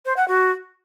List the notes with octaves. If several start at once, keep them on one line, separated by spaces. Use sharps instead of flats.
C5
F#5
F#4